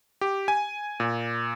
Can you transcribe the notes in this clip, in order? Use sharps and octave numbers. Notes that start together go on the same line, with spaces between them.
G4
G#5
A#2